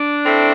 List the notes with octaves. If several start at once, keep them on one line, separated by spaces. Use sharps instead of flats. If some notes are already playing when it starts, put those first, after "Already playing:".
Already playing: D4
A2 A3 C4